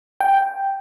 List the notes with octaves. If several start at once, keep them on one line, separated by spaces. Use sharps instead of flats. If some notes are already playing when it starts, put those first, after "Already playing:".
G5